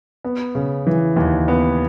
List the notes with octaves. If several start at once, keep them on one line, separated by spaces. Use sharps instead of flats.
B3
C#3
E3
D#2
B3